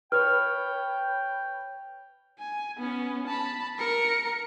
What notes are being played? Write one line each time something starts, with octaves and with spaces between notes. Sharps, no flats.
B4 C#5 G5 F6
G#5
B3 C#4
A5 B5
A#4 C#7